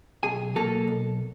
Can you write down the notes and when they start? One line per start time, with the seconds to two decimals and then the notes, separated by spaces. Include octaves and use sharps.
0.23 B1 G#4 G#5
0.55 B2 F#3 A#3 A4 A5
0.88 B1